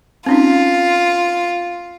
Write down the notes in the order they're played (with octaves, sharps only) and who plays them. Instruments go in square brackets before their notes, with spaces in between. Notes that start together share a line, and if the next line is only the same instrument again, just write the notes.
[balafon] C4 C#4 D#4 [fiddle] F4